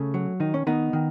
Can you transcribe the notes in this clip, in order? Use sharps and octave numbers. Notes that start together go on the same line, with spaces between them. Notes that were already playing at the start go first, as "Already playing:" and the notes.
Already playing: C#3 A3 C#4
F#3
D#3 D#4
C#4
D#3 B3 D#4
D#3